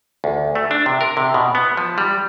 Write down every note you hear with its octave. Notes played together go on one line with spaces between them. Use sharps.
D2
A3
D4
C3
A#4
C3
B2
B3
F3
G3